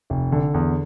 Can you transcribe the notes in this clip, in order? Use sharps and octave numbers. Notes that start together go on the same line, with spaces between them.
F1
D3
E2